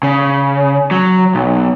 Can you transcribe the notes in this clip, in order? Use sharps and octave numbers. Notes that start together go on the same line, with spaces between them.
C#3
F#3
B1